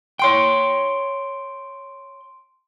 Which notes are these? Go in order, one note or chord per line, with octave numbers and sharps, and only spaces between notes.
C#5 G5 C6 D7